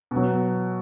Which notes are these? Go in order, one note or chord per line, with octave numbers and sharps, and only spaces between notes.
B2 F#3